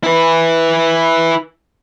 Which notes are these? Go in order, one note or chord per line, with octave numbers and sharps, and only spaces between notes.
E4 B4